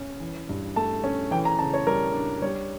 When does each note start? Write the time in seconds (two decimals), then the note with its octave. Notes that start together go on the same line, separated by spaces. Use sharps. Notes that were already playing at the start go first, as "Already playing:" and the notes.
Already playing: C#4
0.20 E3
0.49 G2
0.76 A3 A5
1.04 C#4
1.31 E3 G5
1.45 A#5
1.59 C#3 A5
1.74 C#5
1.87 G3 A#4
2.14 D4
2.42 G3 C#5